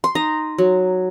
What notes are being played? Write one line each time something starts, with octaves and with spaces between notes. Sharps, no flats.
C6
D#4 A#5
F#3